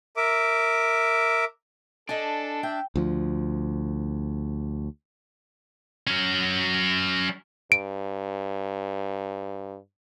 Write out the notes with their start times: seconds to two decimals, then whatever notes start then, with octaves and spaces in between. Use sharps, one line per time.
0.17 A#4 E5 D6
2.09 D4 A4 D#5 G#5
2.63 E5 G5
2.96 D2 F3
6.07 F#3 C#4
7.72 G2 D7